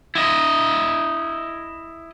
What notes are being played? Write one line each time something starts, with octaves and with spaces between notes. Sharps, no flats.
E4 D#5